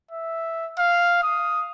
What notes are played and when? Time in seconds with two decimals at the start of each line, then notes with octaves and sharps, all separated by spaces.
0.11 E5
0.79 F5
1.23 D#6